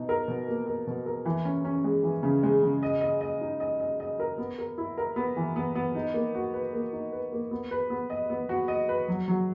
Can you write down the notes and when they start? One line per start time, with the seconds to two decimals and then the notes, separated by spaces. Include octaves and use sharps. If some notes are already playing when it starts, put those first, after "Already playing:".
Already playing: B2 D#4
0.09 A#4
0.28 B2
0.48 A#3
0.66 A#4
0.87 B2
1.06 A#4
1.25 E3
1.45 C#4
1.65 C#4
1.84 G#3
2.03 E3
2.23 C#3
2.43 G#3
2.63 C#3
2.83 D#5
3.01 D#5
3.21 D#5
3.41 D#4
3.60 D#5
3.80 D#5
4.00 D#5
4.20 A#4
4.38 B3
4.59 A#4
4.78 E4
4.98 A#4
5.16 B3
5.37 E3
5.56 B3
5.75 B3
5.95 D#4
6.14 A#3
6.35 F#4
6.54 B4
6.73 A#3
6.92 D#4
7.12 B4
7.32 A#3
7.51 B3
7.71 B4
7.90 B3
8.10 D#5
8.30 B3
8.49 F#4
8.68 D#5
8.89 B4
9.08 F#3
9.28 F#3